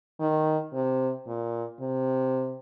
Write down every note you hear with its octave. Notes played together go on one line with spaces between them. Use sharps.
D#3
C3
A#2
C3